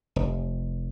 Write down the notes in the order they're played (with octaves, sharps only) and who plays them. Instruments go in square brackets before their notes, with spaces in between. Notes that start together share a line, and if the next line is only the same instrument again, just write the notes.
[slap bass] F1